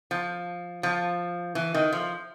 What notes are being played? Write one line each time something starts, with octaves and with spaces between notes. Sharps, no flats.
F3
F3
E3
D#3
F3